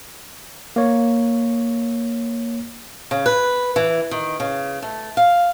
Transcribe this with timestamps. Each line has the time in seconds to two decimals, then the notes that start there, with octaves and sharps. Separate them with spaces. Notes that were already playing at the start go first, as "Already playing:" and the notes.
0.76 A#3 C#5
3.11 C#3
3.26 B4
3.76 E3
4.11 D#3
4.40 C#3
4.82 A3
5.17 F5